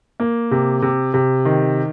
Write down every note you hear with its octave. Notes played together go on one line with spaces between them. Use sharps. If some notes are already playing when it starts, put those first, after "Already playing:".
A#3
C3
C3
C3
D#3